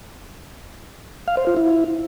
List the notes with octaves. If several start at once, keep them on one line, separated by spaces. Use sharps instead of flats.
F5
C5
F4
E4